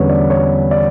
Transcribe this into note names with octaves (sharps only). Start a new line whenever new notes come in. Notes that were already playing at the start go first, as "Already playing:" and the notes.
Already playing: E2 D3 G3 C#4 B4 C#5
D5
C#5
D5